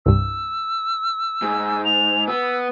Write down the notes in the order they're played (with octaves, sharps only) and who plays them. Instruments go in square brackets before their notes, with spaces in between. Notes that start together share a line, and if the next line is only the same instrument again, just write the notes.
[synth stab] C2 G2 [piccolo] E6
[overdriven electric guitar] G#2
[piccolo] F7
[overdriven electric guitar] B3 [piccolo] E6